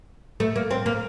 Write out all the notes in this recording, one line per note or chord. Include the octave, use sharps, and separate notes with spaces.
A3
A#3
C4
A#3